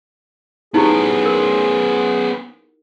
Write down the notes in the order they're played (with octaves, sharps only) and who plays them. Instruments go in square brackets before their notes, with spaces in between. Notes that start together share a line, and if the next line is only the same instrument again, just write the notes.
[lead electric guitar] B3 C#4 [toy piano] D#4 E4 G4 [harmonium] G#4
[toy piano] A#4